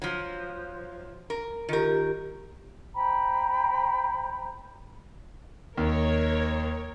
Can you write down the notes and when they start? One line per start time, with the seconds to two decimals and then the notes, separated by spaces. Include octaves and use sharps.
0.02 F3 F#3
1.30 A#4
1.69 D#3 F4 G4 A#4
2.95 C5 G5 A#5 B5
5.77 D#2 A#4 C#5